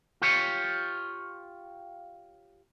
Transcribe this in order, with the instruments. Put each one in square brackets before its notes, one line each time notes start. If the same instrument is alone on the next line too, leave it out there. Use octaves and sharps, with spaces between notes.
[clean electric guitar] F4 G4 C#5